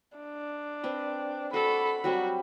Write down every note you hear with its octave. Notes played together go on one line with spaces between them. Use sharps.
D4
C4 B4
F#4 A4 D5 B5
F#3 G3 C4 F#4